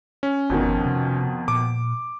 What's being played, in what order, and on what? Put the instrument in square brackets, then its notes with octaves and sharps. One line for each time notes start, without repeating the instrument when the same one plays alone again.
[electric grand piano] C#4
[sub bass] G1 [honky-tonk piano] F2 B2 D#3
[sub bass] C3
[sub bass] A#2 [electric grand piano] D6